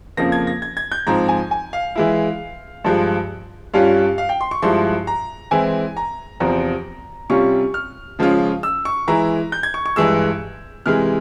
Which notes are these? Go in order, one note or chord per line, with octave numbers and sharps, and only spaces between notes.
F2 C#3 F3 A#3 A#6
G#6
A#6
G#6
G#6
G6
G#2 F3 C4 A#5
G#5
G#5
F5
E3 G#3 E4
G2 F3 G#3
G2 G3 C#4 F4 F5
F5
G5
C6
C#6
G2 F3 G#3 E4 C6
A#5
E3 G#3 C4 E4 G#5
A#5
E2 C3 F3 C4 A#5
C3 G3 C#4 F4 C#6
F6
C#3 F3 G#3 C#4 F4
E6
C#6
E3 G#3 E4 A#5
G6
G#6
C#6
C#6
G2 E3 G#3 E6
C3 E3 G#3 F6